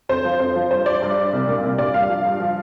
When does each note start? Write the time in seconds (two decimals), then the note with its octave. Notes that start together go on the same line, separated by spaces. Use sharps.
0.09 F2 C5
0.25 F3
0.40 F2 C5
0.56 F3
0.71 G2 C5
0.86 G3 D5
1.02 G2
1.17 G3
1.33 C2
1.48 A#2 G3
1.63 C2
1.78 A#2 G3 D5
1.94 G2 F5
2.09 F3
2.25 G2
2.40 F3